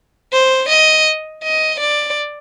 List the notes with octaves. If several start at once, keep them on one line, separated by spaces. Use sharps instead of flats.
C5
D#5
D#5
D5